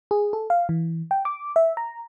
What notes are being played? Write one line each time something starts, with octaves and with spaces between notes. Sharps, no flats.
G#4
A4
F5
E3
G5
D6
E5
A#5